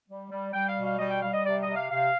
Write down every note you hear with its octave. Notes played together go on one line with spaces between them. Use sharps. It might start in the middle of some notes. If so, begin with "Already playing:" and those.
G3
G3
G3 G5
F5
B2
F5
G3 D#5
G5
G3 F5
D#5
C3 D5
D#5
C3
F5
C3 F5